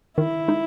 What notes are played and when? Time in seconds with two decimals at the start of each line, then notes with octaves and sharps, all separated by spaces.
0.17 D#3 E4
0.48 G#3 D#4